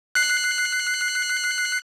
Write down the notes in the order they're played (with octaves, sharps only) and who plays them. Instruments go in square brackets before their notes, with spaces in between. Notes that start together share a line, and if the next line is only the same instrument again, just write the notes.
[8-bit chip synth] F#6 C7